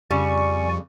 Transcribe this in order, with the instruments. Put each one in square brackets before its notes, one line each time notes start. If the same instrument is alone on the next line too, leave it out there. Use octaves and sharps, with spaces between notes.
[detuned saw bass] F2 [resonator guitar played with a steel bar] C#3 G3 [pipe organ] D5 G#5 [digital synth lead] C#6